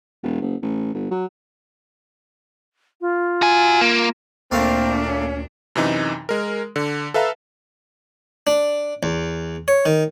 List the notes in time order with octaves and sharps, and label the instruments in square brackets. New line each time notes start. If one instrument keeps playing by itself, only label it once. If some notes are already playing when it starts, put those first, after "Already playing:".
[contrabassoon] E1
F#1
A1
G1
F#3
[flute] F4
[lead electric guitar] F#4 G#5
A#3
[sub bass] D2 [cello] A#2 D4 [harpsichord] A3 A#3 F5 [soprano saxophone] C4
[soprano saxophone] C#4
[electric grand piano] F#2 C3 E3 D#4
G#3 A#4
D3
A4 B4 E5 F5 A#5
[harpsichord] D4
E2
C#5
D#3